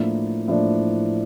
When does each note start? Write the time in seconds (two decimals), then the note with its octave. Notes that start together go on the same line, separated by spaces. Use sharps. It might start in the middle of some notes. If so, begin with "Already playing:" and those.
Already playing: A2 F3 A#3 D4
0.48 A2 F3 A#3 D4